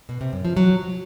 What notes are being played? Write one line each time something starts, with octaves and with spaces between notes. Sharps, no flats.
B2
C3
F#2
F3
F#3